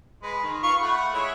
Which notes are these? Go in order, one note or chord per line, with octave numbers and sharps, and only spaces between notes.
G#3 B4
D#3
F4 B4 C#6
A3 F#5 B5
G#3 E4 C#5